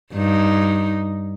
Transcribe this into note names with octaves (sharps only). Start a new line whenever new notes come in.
G2 D#4